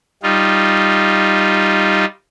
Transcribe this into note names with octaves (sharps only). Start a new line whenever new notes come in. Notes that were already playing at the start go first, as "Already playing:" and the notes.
G3 D#4 F4